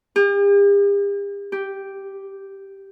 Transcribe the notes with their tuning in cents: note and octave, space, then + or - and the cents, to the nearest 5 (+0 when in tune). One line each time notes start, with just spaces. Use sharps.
G4 +45
G4 -5